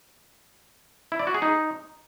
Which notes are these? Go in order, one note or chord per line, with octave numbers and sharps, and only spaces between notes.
E4
D5
F#4
G#4
D#4